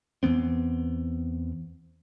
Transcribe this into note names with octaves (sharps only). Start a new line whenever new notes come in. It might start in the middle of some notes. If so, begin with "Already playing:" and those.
E2 E3 B3 C4